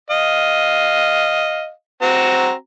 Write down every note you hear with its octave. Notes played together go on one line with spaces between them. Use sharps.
D#5 F5
C4 F#4 A#5